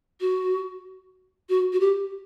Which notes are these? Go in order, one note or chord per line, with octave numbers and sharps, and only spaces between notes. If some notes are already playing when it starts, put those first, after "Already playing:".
F#4
F#4
F#4
G4